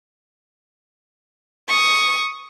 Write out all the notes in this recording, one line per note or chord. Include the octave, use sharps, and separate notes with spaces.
C#6 D#6